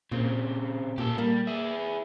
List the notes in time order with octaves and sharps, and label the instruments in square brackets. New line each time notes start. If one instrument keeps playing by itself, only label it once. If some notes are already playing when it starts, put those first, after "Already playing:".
[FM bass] A#2 [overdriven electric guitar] C#3 C4
[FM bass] A#2 [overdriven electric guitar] G4 A4
[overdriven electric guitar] G3 [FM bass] A#3
[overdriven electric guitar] E4 G#4